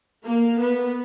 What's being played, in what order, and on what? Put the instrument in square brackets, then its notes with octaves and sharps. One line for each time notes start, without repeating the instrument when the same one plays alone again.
[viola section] A#3
B3